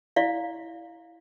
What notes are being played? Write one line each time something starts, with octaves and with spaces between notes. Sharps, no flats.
E4 D5 F5